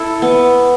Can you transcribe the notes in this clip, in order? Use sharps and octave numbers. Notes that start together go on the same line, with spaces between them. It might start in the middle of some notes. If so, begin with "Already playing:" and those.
Already playing: E4 A4
B3